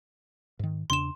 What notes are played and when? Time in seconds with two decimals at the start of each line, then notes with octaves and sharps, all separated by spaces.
0.59 G#2 D#3
0.90 E2 C#3 D4 C6 E7